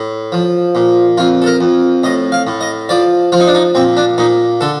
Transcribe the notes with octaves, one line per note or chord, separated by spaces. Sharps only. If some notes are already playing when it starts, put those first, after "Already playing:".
Already playing: A2
F3
A#2
F2 F4
A4
A#4
F2
A2 D#5
F5
A2
D#5
F3 D5
F3 F4
D#4
D4
D#4
A#2 C4
D4
A#2 D#4
D3 A4